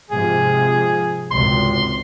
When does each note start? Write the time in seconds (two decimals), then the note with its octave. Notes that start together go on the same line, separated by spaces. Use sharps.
0.10 G#2 C3 F3 G#4
1.31 G#1 C#2 C3 C6